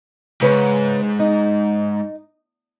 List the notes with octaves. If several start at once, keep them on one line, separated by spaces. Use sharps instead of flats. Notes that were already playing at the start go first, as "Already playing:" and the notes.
G#2 C#3 B4 C#5
D#4